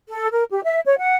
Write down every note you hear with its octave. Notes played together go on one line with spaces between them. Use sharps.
A4
A#4
G4
E5
C#5
F#5